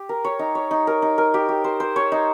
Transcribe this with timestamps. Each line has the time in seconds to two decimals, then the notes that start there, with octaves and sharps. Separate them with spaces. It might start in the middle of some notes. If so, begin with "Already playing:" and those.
Already playing: G4
0.09 A#4
0.24 C#5
0.39 D#4
0.55 C#5
0.71 D#4
0.87 A#4
1.02 D#4
1.18 A#4
1.34 G4
1.49 G4
1.64 C5
1.80 C5
1.96 C#5
2.12 D#4